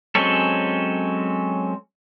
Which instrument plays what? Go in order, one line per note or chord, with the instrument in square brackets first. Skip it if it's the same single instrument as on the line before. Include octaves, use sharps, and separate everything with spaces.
[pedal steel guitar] F#3 G#3 C4 C#4 A4